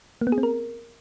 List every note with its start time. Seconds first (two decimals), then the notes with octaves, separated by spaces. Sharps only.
0.21 A#3
0.27 B3
0.32 G#4
0.38 C4
0.43 A#4